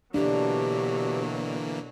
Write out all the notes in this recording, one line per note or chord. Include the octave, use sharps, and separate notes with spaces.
B2 D3 E3 F#3 A#3 D4 G4